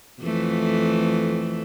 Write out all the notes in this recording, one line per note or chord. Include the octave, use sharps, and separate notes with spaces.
F2 E3 A3